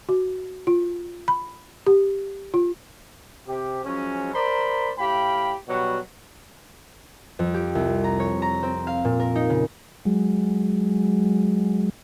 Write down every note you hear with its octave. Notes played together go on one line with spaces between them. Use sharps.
F#4
F4
B5
G4
F4
C3 G4
F3 F#3 G#3 C#4
A#4 C5 D5 A#5 B5
A2 G4 F5 G5 B5
B2 F#3 G3 F#4
F2
G4
C2
A#5
C#5
A#5
C4
F5
A#2
A#4
D#4
C#3
F#3 G#3